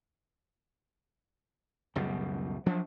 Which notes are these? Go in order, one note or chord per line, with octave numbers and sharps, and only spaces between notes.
C#2 F#2 B2 G3
F3 F#3 D4